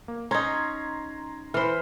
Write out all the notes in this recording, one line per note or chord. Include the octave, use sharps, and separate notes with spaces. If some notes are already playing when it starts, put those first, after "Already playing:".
A#3
C#4 D#4 A#5 C6 G#6
E3 C5 B5 F6